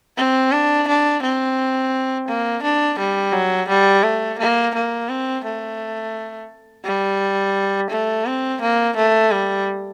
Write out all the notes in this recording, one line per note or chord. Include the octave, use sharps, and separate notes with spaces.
C4
D4
D4
C4
A#3
D4
G3
F#3
G3
A3
A#3
A#3
C4
A3
G3
A3
C4
A#3
A3
G3